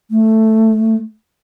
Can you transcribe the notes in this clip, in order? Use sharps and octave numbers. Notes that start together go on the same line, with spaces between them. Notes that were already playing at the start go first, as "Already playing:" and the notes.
A3